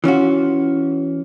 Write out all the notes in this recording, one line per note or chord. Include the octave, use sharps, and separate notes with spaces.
E3 C#4 F4 F#4